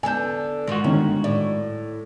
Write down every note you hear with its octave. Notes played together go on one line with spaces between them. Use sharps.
D3 B3 A4 G#5 G6
G#2 D#3 F4 F#4
G1 D#3 C#4
A2 D5